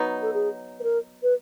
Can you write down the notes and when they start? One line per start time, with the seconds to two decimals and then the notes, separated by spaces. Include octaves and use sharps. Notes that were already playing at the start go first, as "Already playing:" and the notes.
Already playing: F#3 B3 D#4
0.22 A4
0.34 G#4
0.80 B4
0.83 A#4
1.23 B4